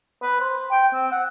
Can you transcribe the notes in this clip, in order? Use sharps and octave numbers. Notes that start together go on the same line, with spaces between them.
B4
C5
G5
C4
F#5